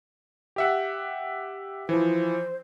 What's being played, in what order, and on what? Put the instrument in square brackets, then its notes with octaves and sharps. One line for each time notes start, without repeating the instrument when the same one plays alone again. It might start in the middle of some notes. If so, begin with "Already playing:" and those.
[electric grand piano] G4 E5 F#5
[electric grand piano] E3 F3 [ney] C5